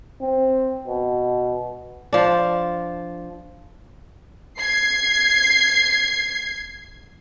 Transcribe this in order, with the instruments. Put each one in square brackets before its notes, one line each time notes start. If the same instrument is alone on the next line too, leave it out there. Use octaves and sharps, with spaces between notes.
[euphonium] C4
B2
[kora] F3 D4
[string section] G#6 C7